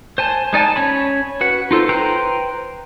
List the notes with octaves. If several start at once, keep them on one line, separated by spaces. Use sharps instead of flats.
C5 G#5 A5
G#3 D#4 D5 G#5 A5
C#4 C#5 B5
F#4 B4 F#5
D#4 F4 A4 C5
B4 C5 G5 A#5 C6